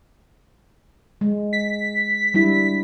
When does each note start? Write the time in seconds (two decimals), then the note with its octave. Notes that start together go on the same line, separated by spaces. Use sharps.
1.21 G#3
1.53 B6
2.34 G3 D4 E4